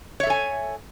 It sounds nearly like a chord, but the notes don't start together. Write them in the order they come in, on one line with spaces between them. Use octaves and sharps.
C#5 E5 A4 G#5